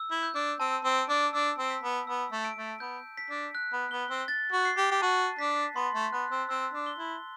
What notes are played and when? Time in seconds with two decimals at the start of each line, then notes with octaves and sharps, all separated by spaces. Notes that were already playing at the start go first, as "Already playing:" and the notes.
Already playing: E6
0.11 E4
0.23 G6
0.35 D4
0.60 C4 A5
0.84 C4
0.97 D7
1.09 D4
1.33 D4 E6
1.58 C4
1.70 B6
1.83 B3
2.07 B3 E6
2.32 A3
2.45 D7
2.56 A3
2.80 B3 G6
3.17 B6
3.30 D4
3.55 F#6
3.73 B3
3.91 B3 G7
4.10 C4
4.28 A6
4.52 F#4
4.65 C7
4.77 G4
4.91 G4
5.02 F#4 A5
5.39 D4 B6
5.76 B3 C6
5.94 A3
6.12 B3 F#6
6.31 C4
6.49 C4 E6
6.74 D4
6.86 G7
6.98 E4